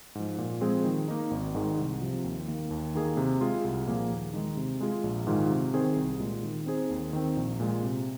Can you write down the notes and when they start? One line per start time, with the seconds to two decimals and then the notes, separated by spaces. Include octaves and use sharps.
0.15 G#2 F3
0.38 A#2
0.61 F3 G#3 C4 G#4
0.84 D#3
1.08 A#3 D#4
1.31 G#1
1.55 G#2 D#3 G#3 D#4
1.78 C2
2.01 C3 F3
2.24 D#2
2.48 D#3 A#3
2.71 D#2
2.95 D#3 A#3 D#4 G#4
3.17 C3
3.41 G#3 F4 G#4
3.64 C2
3.87 A#2 F3 A#3 G#4
4.11 D#2
4.33 D#3 G#3 D#4
4.57 C3
4.81 G#3 F4 G#4
5.04 A#1
5.27 G#2 D#3 G#3 F4
5.51 C3
5.74 D#3 C4 G#4 C5
5.96 C2
6.20 A#2 G#3
6.43 D#3
6.66 C4 D#4 G#4 C5
6.90 D#2
7.13 D#3 C4
7.37 A#1
7.60 A#2 G#3
7.83 C3